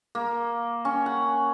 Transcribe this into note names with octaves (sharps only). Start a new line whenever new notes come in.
A#3
C#4
F#5